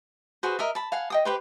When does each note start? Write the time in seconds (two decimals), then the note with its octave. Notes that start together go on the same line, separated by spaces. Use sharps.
0.43 F#4 G#4 B4 C5
0.59 A#4 D#5 E5
0.75 A5 B5
0.92 F5 F#5 G#5
1.10 D#5 G5 D#6
1.25 G4 B4 C5